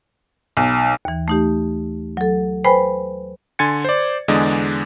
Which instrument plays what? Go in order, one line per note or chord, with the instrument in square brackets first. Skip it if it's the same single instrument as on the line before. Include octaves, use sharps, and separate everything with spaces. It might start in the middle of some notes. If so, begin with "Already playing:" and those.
[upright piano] B1
[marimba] D#2 E3
A3 D#4 G4
F#3 A4
B4 C5 G5 G#5 B5
[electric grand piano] D3 G#5 C6 G#6 A6 C#7
C5 D5
E2 D3 G#3 G#4 D5 D#5